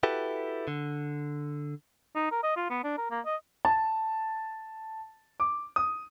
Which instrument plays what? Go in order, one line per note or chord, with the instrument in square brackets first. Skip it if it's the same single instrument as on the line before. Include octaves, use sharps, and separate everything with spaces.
[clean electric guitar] E4 F#4 G4 A4 B4
D3
[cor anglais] D#4
A#4
D#5
F4
B3
D4
A#4
A#3
D#5
[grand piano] A5
D6
D#6